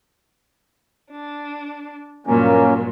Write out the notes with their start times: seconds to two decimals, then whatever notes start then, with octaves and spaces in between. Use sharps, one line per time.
1.11 D4
2.27 G2 A#2 F#3 A#3 C#4